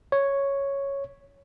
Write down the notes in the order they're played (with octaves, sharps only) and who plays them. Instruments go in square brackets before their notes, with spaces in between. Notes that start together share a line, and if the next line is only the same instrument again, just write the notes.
[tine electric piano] C#5